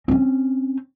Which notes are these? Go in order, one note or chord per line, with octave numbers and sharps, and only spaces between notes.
C4 C#4